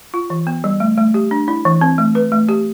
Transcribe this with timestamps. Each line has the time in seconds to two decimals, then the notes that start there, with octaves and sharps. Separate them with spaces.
0.14 F4
0.30 E3
0.47 B3
0.64 G3
0.80 A3
0.98 A3
1.14 G4
1.31 D4
1.48 E4
1.65 E3
1.81 C4
1.98 A3
2.15 B4
2.32 A3
2.49 G4